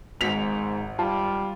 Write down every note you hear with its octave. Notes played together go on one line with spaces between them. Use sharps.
G#1 G#2 B6 F7
G3 F4 A5